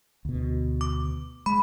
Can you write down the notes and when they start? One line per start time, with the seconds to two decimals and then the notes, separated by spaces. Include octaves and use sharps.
0.25 D2 B2
0.81 D6
1.46 G#3 B5